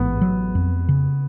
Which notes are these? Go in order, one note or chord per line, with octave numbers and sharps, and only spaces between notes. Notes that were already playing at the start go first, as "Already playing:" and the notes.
Already playing: A1 G#2 B3
F#3
F2
C#3